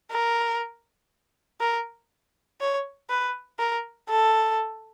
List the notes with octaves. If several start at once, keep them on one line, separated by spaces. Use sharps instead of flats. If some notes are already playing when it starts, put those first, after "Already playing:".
A#4
A#4
C#5
B4
A#4
A4